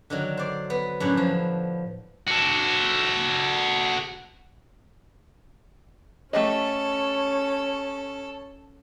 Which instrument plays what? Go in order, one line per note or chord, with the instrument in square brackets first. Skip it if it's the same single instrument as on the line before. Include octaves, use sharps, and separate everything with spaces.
[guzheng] D3 D#3 F#3
C5 D5
B3
F#2 A2 D4 F#5
F3
[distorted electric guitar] F#4 A4
[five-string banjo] A3 G4 D#5 [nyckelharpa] C#4 [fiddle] A4 [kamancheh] C#5 A5